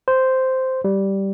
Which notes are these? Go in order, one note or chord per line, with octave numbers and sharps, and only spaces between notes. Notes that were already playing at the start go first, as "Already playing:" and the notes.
C5
G3